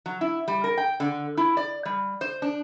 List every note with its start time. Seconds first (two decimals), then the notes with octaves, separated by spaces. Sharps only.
0.06 F#3
0.21 E4
0.48 G3
0.64 A#4
0.78 G5
1.00 D3
1.37 E4
1.57 D5
1.86 G3
2.21 C5
2.42 D4